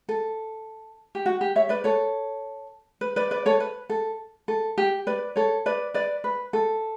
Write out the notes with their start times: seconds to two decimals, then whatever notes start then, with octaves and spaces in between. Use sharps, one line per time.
0.09 A4
1.15 G4
1.26 F#4
1.41 G4
1.56 C#5 E5
1.69 B4 D5
1.84 A4 C#5
3.01 B4
3.16 B4 D5
3.31 B4 D5
3.46 A4 C#5
3.60 B4
3.90 A4
4.48 A4
4.78 G4
5.07 B4 D5
5.36 A4 C#5
5.66 B4 D5
5.94 B4 D5
6.24 B4
6.53 A4